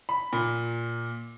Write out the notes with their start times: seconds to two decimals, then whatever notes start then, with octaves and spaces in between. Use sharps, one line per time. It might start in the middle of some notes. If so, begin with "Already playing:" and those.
0.09 B5
0.33 A#2